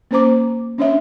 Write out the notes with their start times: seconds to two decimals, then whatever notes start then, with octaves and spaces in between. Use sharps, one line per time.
0.11 A#3 C#4 C5 A#5 D6
0.78 C#4 D4 C#5 E5